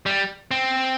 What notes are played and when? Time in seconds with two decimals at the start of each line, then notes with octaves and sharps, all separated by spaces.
0.06 G3
0.51 C4